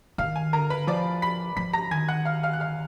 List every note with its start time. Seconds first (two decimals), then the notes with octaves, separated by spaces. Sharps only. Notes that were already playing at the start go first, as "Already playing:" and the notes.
0.18 D#3 F5 F6
0.36 G#5
0.53 D3 A#4 A#5
0.70 B4 B5
0.87 F3 D5 D6
1.22 B5 B6
1.57 F3 B5 B6
1.73 A#5 A#6
1.91 D#3 G#5 G#6
2.08 F#5 F#6
2.25 F5 F6
2.43 F5 F6
2.53 F#6
2.60 F5 F6